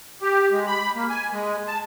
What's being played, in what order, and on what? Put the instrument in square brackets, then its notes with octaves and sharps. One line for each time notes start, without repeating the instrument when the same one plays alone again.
[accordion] G4
G#3
B5
A#3
G#5
G#3
A5